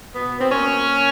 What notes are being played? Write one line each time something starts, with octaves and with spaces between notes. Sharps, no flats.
B2 B3
C4
A#3 C#4
A#3